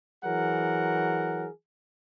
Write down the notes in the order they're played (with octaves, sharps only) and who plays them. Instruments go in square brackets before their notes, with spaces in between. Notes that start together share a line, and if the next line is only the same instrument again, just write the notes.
[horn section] E3 F#3 G#4 A#4 F#5